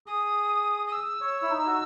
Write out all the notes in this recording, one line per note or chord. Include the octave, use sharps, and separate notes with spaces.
G#4 D#6
D#6
E6
C#5
E4
D#4
F#4